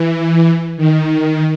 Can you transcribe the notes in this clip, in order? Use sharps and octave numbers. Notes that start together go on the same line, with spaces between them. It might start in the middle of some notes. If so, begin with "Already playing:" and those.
Already playing: E3
D#3